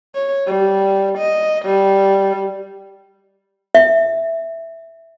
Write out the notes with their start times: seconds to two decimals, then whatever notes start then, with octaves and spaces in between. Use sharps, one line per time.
0.15 C#5
0.47 G3
1.18 D#5
1.65 G3
3.75 E5